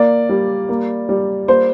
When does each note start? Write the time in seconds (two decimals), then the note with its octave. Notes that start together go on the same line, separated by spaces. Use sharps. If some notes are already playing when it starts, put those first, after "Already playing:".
Already playing: A#3 D5
0.29 G3
0.69 A#3
1.09 G3
1.48 A#3 C5